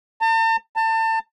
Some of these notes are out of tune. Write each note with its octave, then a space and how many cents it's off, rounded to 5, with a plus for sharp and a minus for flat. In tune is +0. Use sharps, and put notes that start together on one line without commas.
A5 +45
A5 +30